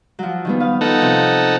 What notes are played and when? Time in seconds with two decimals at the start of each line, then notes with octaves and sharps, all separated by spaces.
0.19 F3 F#3
0.45 D#3 G3 B3
0.60 B4 F5 D#6
0.81 B3 D#4 F4 A4 F#5
1.01 C3 F3 G6